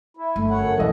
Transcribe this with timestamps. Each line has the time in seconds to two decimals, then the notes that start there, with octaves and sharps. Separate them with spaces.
0.17 E4
0.36 G1 A3
0.50 F#2 C#5 F#5
0.77 E1 B1 E3 A4 D#5